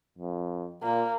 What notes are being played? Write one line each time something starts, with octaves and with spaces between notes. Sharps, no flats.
F2
A#2 A#3